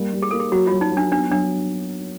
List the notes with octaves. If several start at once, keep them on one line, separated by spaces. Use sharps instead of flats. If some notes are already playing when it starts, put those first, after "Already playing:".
Already playing: G3 A#3
G3
G#4
A#3 A4
G#4
F#3 F#4
F4
F#3
D#4
F#3
D4
B3 D4
F#3 D4